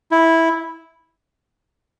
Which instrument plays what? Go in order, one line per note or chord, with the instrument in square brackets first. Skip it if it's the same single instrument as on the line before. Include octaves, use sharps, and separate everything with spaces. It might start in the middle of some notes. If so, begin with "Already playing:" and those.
[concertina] E4